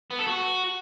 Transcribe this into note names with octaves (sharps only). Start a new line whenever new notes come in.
B3
A4
F#4